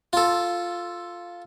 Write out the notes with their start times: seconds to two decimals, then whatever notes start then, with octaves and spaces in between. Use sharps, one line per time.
0.13 F4 A4